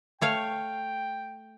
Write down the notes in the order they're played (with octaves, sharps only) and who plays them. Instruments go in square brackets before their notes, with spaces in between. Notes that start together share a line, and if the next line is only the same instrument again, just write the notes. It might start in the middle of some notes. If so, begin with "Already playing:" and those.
[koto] A3 C#5 F5 [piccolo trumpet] G5